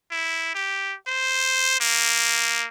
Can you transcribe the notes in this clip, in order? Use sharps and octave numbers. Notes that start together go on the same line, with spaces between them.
E4
G4
C5
A#3